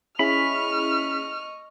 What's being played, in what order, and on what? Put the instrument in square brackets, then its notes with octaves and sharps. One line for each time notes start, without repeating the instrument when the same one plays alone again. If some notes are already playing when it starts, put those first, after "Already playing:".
[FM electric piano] C#4 E4 G#4 [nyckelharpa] D#5 C#6 [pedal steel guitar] B5 [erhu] F6